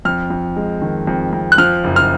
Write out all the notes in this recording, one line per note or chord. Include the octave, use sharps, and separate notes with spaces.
F2 F6
F2
G#3
D#3
F2
F2
F#6
F3 F6
F#1
F6